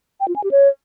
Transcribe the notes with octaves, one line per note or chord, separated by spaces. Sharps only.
G5
F4
G#5
G4
C#5